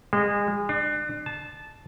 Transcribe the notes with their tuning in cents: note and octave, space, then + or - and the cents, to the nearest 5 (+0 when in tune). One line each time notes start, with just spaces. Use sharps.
G#3 -30
D4 +35
A5 -15